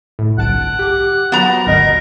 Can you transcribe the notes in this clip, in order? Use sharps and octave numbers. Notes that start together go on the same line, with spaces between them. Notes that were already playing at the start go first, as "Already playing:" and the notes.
A2
G1 C2 F#5 A5 D7
G4 D6
F3 F#3 B3 A#5
G#1 D2 A#4 D#5